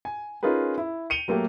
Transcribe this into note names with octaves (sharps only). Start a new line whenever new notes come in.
G#5
C#4 D#4 F4 G#4 A#4 B4
E4
C#7 D#7 F7 G7
F#3 A3 A#3 G4